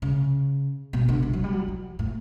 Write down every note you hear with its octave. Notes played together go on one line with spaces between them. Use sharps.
C#3
B2
D3
E3
F#3
G3
F#3
E3
A2